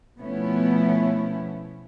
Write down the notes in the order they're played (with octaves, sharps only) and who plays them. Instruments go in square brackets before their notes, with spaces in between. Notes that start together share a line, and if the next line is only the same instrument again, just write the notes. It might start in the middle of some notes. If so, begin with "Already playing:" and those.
[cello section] B2 F3 A3 B3 C#4 E4